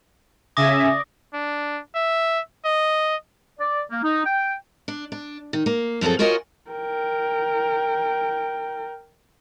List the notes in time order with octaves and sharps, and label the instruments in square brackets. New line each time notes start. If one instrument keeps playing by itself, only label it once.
[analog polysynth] C#3 E5 G#5 [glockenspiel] D6 D#6 A#6
[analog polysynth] D5
[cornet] D4
E5
D#5
[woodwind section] D5
A#3
D#4
G5
[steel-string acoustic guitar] D4
D4
D#3
A#3
F#2 F3 C4 G#4 A4
F4 F#4 A#4 C#5 D#5 G#5
[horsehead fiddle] A#4 G5